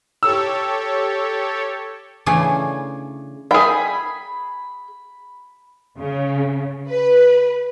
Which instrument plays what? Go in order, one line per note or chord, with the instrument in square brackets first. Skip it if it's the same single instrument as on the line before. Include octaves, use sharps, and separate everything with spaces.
[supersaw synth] G4 A4 C#5 [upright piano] E6
[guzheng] C#3 E3 A3 D4 G#4
[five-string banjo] G#4 G5 [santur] B5
[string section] C#3
B4